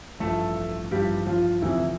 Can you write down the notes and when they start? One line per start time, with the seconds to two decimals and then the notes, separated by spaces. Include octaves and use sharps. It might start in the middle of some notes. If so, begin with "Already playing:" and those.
0.20 A1 G2 F3 A3 A4
0.91 A1 G2 F3 G3 G4
1.27 F3 F4
1.62 D2 C3 E3 F3 E4